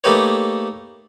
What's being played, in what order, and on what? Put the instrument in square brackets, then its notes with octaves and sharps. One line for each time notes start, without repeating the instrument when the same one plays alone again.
[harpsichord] A3 A#3 D#4 G4 B4 C#5